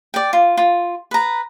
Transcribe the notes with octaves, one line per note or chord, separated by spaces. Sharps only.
D5 G5
F4
F4
B4 A#5